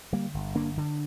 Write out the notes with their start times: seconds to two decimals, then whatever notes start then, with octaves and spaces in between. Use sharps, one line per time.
0.12 D3 G3 A#3
0.34 G1
0.55 D3 A#3 D4
0.77 D3